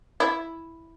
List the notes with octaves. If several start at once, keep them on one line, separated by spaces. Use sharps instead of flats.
E4